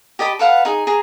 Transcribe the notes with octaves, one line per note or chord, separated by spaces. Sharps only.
G4 D#5 A5 B5
A4 B4 F5 F#5
D#4 G#4
G#4 A#5